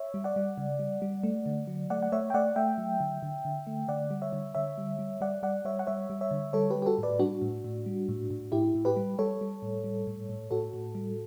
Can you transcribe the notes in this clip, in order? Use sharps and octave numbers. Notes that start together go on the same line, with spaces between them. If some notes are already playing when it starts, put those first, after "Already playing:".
Already playing: C#5 E5
G3
D5 F#5
G3
C#3
G3
G3
A3
D3
F#3
A3 D5 F#5
F#5
A3 C#5 E5
G5
A3 D5 F#5
A3 E5 G5
F#3
D3
D3
D3
A3
D3 D5 F#5
G3
C#5 E5
D3
D3 C#5 E5
G3
G3
G3 D5 F#5
G3 D5 F#5
G3 C#5 E5
F#5
G3 C#5 E5
G3
C#5 E5
D3
G3 A4 C#5
G4 B4
G3
G4
F#4 A4
A2 B4 D5
G3 D4 F#4
A2
A2
G3
A2
A2
A2 E4 G4
A2
G4 B4
G3
G3 A4 C#5
G3
A2
G3
A2
A2
A2 F#4 A4
A2
G3